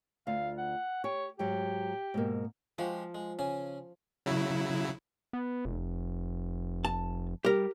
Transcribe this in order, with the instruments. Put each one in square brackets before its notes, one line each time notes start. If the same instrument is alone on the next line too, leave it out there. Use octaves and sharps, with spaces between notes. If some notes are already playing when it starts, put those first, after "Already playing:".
[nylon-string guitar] D2 F4 [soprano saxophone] F5
[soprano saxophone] F#5
[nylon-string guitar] G4 [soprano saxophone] C#5
[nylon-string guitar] G#2 F#3 [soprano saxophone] G4
[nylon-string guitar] G#2 B2 A#3
[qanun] F3 [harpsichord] G#3 F#4 G4
[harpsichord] G#3
C#3 C#4 G#5
[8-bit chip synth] C#3 F#3 E4
[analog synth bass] B3
F1
[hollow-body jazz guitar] A5
[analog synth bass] G3 [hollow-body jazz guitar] G4 A#4